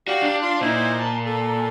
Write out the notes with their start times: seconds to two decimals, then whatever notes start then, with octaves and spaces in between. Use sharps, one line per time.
0.08 F#4 G4 D5 F5
0.22 D4
0.42 F4 C6
0.61 A#2 D#4 E4 C5
0.99 A5
1.25 A4